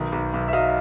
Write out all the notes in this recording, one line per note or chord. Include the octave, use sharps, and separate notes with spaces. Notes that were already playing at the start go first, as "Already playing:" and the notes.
Already playing: B1 D#3
B1
B1
E5
F#3 D#5 F5